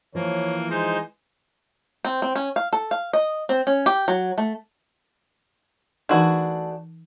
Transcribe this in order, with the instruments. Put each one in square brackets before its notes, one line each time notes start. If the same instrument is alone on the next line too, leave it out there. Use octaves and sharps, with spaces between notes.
[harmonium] E3 [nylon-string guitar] F3 [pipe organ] A#3 [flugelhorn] C#5
[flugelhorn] G#3 [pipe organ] D#4 C5
[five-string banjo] C4
C4
C#4
F5
A4
F5
D#5
C4
C#4
G4
F#3
A3
[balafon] E3 D#4 [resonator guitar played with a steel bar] A3 B4 [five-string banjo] D4 F#4 G#4